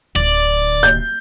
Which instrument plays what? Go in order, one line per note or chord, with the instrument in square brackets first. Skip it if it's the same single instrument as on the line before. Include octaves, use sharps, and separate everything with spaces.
[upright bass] D1 D3 [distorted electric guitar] D5
[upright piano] G6